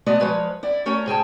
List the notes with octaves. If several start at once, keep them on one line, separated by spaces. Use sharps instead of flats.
G#3 A3 B3 D5 D#5
F3 G#3 B4 C#5
E4 D5
A3 C#4 A#4 C#5
G#2 G#4 G5 A5